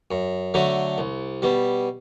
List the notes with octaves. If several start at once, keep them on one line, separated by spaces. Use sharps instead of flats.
F#2
D3 F#3 A3 D4
C2
B2 G3